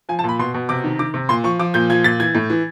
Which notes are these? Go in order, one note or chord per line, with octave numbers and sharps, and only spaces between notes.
F3 G#5
A5
A#2 B5
B2 C6
B2
C3 D6
D#3
D#3 D6
C3
A#2 C6
F3 C#6
F3 D6
A#2 G6
F3 G#6
A#2 A6
E3 G#6
A2
E3